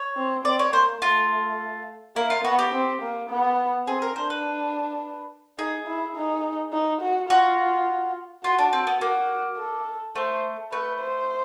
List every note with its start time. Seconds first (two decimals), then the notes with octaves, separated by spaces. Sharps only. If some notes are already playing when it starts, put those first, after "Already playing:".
Already playing: C#5
0.17 C4
0.45 C4 D5
0.59 C#5
0.73 A#3 C5
1.02 A3 F4
2.16 A#3 E4
2.30 F4
2.45 B3 F#4
2.59 G4
2.73 C4
3.02 A#3
3.30 B3
3.87 C4 G#4
4.02 A#4
4.16 D4 C5
4.30 B4
5.58 D#4 G#4
5.87 E4
6.16 D#4
6.73 D#4
7.01 F#4
7.29 F4 F#4
8.44 F4 F#4
8.58 D4
8.73 C4
8.87 B3
9.01 A#3 F#4
9.58 A4
10.15 A3 C5
10.72 A3 B4
11.00 C5